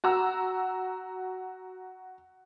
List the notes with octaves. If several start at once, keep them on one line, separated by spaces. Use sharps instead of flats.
F#4 A#5 E6